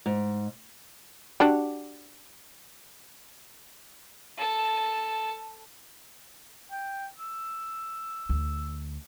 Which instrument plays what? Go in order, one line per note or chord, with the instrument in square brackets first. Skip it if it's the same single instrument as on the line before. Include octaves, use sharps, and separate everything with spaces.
[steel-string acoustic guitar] G#2
[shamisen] D4 F#4 G4
[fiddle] A4 A5
[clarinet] G5
E6
[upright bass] D2